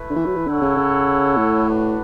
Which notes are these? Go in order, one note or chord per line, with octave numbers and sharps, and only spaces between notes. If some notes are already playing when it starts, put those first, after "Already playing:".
Already playing: A3 E4 B4
D3
E3
F#3
E3
D3 E4 A4 C#5 F#5
C#3
C#3
A2
D4 F#4 B4 F#5